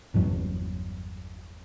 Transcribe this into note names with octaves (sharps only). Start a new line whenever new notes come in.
G1 E2 G2 F#3